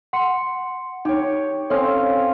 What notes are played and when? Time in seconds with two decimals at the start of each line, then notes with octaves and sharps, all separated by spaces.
0.13 F#5 C6 C#7
1.05 D#4 G4 C#5
1.70 C4 C#4 A4 C#5 F5